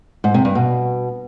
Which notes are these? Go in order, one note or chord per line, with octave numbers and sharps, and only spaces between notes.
G#2
C3
G2
B2